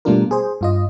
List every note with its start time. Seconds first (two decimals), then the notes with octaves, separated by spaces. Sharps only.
0.05 B2 G3 A3 D4 F4 A#4
0.31 G#4 C5
0.61 G2 F4 D#5